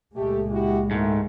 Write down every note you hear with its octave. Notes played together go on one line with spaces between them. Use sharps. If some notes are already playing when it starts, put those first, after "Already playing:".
C#2 A#2 G#3 A3 G4
E4 F#4 G4
G#2 D#3 A3